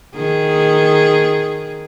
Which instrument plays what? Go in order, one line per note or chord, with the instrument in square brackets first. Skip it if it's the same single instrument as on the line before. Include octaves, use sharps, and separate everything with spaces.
[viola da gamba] D#3 G#4